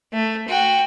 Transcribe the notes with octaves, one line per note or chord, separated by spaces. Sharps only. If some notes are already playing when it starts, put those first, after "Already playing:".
A3
F#4 G5